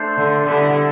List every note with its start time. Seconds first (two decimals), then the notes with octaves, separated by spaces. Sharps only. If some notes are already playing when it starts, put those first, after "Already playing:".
Already playing: A3 D4 A4 C5
0.17 D3
0.46 D3 G3 B3 E4 A4